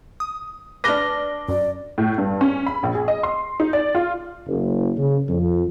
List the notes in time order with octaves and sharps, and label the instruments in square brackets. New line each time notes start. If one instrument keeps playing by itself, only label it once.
[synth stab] D#6
[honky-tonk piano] D4 A#6 [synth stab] B4 F6 [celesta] D6 G7
[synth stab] F#2 [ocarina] D5
[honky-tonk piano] A2
G2
C#4
B5
A#1
G#4
D#5
C6
D#4
D5
F4
[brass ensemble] F#1
C#3
F2